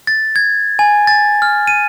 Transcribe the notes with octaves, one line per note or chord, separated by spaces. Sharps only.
A6
G#6
G#5
A6
F6
D#7